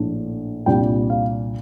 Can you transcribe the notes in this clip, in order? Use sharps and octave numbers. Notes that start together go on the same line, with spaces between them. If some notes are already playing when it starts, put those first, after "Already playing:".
Already playing: A#1 A2 A3 D4
C2 A#2 G3 D4 G5
F5